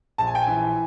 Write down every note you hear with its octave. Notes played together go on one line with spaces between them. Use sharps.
A#1 A5
G#5
G5
E3 G#5